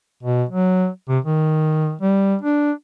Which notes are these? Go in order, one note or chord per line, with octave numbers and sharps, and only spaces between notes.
B2
F#3
C3
D#3
G3
D4